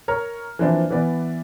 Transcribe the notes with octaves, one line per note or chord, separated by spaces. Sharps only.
A#4 C#5 A#5 F6
E3 F3 A#3 C4 D4 E4
E3 B3 D5